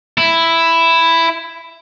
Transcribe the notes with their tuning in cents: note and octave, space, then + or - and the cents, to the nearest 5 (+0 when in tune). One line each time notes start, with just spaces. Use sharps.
E4 +5